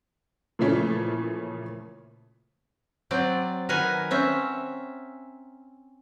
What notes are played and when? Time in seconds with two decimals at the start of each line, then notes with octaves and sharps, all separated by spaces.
0.59 A#2 C#3 E3 F3 A3 C#4
3.11 F#3 C4 D5
3.69 D#3 A#4 B4 F#5 G#5
4.11 C4 C#4 E5